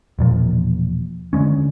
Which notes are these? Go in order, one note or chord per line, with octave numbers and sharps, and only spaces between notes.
E1 A#2 F3
D3 F#3 G#3 C#4